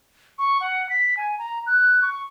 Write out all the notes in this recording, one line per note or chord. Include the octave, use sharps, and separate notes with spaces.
C#6
F#5
B6
G#5
A#5
F#6
C#6